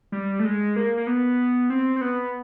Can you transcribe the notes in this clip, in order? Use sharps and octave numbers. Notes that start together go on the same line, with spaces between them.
G3
A3
G#3
A#3
A#3
B3
C4
C4
B3